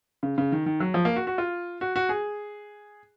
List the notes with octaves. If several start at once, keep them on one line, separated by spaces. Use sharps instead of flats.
C#3
C#3
D#3
D#3
F#3
F3
A#3
F#4
F#4
F4
F#4
F#4
G#4